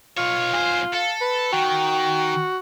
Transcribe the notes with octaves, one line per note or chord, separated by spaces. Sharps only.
B2 F4 C#5
B1 C5 G#5
A4 F5
B4
D#3 F#4 G5